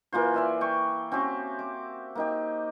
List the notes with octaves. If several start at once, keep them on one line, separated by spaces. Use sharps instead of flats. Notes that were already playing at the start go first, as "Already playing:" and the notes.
E3 A#3 F4 C5
D5 E5 G#5
G5 C#6
C4 C#4 F#4 G4
D6
A#3 D#4 G4